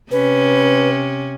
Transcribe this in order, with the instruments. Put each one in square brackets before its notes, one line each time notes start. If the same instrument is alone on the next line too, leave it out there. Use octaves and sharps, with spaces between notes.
[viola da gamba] C3 C#4 [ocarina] B4